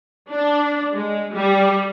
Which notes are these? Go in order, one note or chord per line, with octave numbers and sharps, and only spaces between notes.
D4
G#3
G3